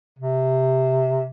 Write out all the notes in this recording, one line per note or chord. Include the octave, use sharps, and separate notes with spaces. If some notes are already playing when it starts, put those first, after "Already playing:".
C3